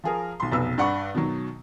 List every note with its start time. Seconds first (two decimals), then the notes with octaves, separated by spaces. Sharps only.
0.04 F3 G#4 A#4
0.40 B1 C6
0.51 F1 B1 B3 E6
0.78 G2 D5 F#5 B5 C#6
1.15 B2 D#3 F#3